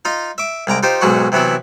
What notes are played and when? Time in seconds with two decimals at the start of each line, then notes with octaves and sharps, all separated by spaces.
0.05 D#4 F4 D#5
0.38 E5 D6
0.67 C2 G#3 A#5 D6
0.83 D#4 F4 G4 C5
1.01 B1 G#2 F#3 G#3 F#4 C#6
1.32 C3 E3 F#3 B3 E4